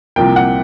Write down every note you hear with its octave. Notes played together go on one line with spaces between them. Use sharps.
C2 C3 F3 A#3 G5
F#5